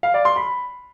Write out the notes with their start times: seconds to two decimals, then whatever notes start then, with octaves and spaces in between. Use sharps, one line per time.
0.03 F5
0.14 D5
0.25 C6
0.36 B5